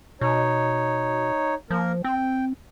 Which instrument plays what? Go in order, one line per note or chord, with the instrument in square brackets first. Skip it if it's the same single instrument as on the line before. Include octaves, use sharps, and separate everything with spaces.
[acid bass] B2 [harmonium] D#4 C#5
[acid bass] F3 [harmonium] A#3 A#4
[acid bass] C4 [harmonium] G5